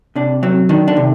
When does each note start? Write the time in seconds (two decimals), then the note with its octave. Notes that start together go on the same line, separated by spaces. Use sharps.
0.16 C3 D4
0.43 F#3 C4
0.69 D#3 D4
0.88 D4
0.97 C3